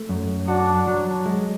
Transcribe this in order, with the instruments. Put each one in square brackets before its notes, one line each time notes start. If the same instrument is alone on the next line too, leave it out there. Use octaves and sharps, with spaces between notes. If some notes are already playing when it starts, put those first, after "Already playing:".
Already playing: [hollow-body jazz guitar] A3
F#2
[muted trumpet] D4 [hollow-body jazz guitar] F#4
[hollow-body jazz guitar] F#3
G#3